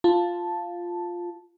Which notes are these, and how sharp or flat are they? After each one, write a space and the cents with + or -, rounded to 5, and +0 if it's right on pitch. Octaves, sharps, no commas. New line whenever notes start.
F4 +0 A5 +0